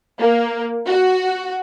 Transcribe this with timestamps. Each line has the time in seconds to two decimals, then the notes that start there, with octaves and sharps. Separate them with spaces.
0.18 A#3
0.86 F#4